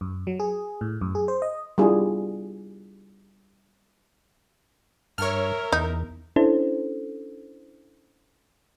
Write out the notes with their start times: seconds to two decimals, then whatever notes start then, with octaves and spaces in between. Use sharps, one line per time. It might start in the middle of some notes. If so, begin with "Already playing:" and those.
0.01 F#2
0.27 F#3
0.40 G#4
0.81 A2
1.01 F#2
1.15 G#4
1.28 C5
1.42 D#5
1.78 G3 B3 D4 E4 F4 G#4
5.18 G2 A#4 C#5 E5 F6
5.72 E2 D#4
6.36 C#4 D4 E4 A4 C5